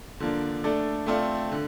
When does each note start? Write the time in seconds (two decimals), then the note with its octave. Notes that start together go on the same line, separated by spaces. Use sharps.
0.20 D3 F3 A#3 D4
0.64 A3 D4 A4 D5
1.06 A3 C4 F4 A4 D5
1.52 D3